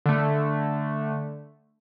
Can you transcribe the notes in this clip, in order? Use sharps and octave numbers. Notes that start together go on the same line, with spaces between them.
D3 A3